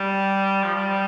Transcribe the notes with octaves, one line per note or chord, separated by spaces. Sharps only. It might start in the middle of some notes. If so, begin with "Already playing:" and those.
Already playing: G3
F3
G3